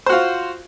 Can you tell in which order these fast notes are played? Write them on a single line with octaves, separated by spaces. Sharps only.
C5 F#4 F4